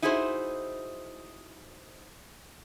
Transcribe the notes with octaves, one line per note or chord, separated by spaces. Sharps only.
D#4 E4 F#4 G#4 A#4 C5